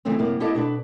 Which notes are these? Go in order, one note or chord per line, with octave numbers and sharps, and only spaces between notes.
C#3 E3 F3 A3 C4 C#4
F#2 C3 A#3 B3
A#3 E4 G4 A4 D#5 A5
B2 D4 B4